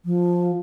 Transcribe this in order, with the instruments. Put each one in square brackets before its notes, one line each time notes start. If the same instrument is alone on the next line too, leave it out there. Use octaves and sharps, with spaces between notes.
[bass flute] F3